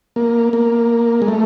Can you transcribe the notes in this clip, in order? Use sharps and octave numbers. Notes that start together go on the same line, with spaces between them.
A#3
A#3
G#3
A3